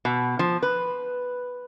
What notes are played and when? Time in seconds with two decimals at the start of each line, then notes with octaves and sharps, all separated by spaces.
0.05 B2
0.39 F3
0.63 B4